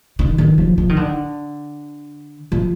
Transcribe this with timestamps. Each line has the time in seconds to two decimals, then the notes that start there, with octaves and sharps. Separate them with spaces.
0.19 D#3
0.38 D#3
0.58 F3
0.78 F3
0.89 D#3
0.97 D3
2.52 F3